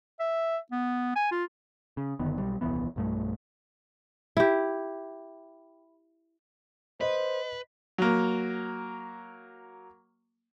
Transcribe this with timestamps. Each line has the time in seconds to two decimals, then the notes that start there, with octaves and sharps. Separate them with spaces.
0.20 E5
0.72 B3
1.16 G#5
1.32 F4
1.97 C#3
2.19 F#1 D3 D#3 B3
2.38 B1 G3
2.61 D#1 C2 E3 B3
2.96 B1 G2 A3
4.37 E4 G4
7.01 B4 C5 D#5
7.98 F#3 A#3